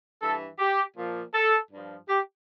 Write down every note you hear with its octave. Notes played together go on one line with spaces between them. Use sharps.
G2 E3 A4
G4
A#2 F3
A4
G2 F3
G4